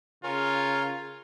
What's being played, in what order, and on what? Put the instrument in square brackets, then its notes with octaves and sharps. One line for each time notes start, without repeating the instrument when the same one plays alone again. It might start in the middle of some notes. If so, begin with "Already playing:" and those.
[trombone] C#3 [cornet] F4 [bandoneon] A#4 C#5 G#5